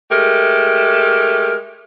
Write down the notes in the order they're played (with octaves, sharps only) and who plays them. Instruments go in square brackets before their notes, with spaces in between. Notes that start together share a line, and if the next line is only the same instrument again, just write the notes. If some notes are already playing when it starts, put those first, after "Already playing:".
[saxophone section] G#3 A3 G4 A#4